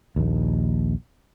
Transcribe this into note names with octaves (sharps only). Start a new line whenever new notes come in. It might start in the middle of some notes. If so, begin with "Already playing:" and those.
A#1 D#2